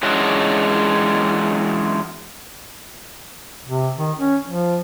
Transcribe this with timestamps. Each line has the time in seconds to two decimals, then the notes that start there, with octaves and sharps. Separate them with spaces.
0.03 E3 F#3 G#3 C#4 D4 F#4
3.67 C3
3.98 D#3
4.18 C#4
4.48 F3